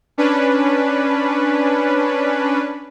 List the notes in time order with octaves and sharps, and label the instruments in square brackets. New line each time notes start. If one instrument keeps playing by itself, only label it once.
[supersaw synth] C#4 D4 B4